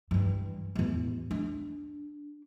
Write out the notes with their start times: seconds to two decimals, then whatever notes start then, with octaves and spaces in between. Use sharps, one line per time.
0.11 G2 E3
0.75 A1 E2
1.31 D4